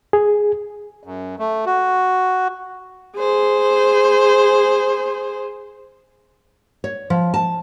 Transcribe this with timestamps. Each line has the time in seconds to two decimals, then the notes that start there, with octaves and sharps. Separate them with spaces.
0.13 G#4
1.03 F#2
1.39 A3
1.66 F#4
3.17 G#4 C5
6.84 C#5
7.10 F3
7.34 A5